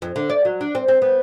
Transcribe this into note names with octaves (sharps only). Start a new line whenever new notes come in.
F2
D3
D5
F#3
D4
C4
C4
B3